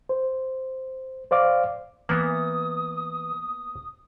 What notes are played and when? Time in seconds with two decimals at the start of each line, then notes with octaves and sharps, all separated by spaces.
0.09 C5
1.31 C5 D5 F5 D6
2.09 E3 A#3 B3 D#6